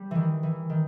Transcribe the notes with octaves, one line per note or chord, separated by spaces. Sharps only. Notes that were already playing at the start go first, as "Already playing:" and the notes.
Already playing: G3
D#3 E3
E3
D#3